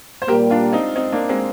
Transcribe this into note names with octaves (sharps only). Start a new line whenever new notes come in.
C5
A#2 G3 A#3 G4 A#4
D4 F4
C4 D#4
C4 D#4
A#3 D4
G#3 C4